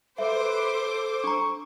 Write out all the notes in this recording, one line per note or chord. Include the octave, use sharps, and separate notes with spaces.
A4 B4 C5 E5 D6
D4 A#5 C#6